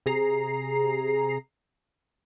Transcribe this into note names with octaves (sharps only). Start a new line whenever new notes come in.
C3 G#4 A#5 C7